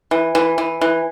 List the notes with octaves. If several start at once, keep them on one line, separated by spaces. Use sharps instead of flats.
E3
E3
E3
E3